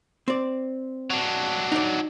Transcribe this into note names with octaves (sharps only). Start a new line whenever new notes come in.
C4 D5
F#3 D4
D#4 D5